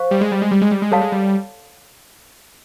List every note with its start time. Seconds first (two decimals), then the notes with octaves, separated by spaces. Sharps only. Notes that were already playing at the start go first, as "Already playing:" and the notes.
Already playing: C5 F5 C#6
0.11 G3
0.21 G#3
0.32 G3
0.42 G#3
0.51 G3
0.61 G#3
0.71 G3
0.82 G#3
0.92 G3 A4 C#5 F5 A5 C6
1.01 G#3
1.12 G3